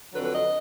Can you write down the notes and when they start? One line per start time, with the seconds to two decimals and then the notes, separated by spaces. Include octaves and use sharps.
0.14 F2 D3 F#3 B4
0.24 B4
0.34 D#5